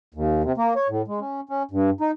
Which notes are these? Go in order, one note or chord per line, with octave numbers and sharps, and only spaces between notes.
D#2
C3
A#3
C#5
A2
G#3
C#4
C#4
G2
D#4